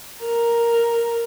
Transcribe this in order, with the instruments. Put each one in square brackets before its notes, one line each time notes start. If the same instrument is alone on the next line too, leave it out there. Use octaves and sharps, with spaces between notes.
[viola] A#4